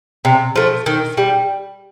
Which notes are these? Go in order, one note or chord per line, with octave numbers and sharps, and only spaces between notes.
C3
F3 A3
D#3
G3